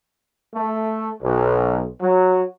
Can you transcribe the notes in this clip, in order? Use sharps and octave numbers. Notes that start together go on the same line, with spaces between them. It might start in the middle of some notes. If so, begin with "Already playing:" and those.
A3
B1
F#3